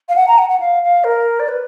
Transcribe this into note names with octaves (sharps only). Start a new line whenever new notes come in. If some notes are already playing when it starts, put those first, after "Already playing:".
F5
F#5
A#5
F#5
F#5
F5
F5
A#4
D5
B4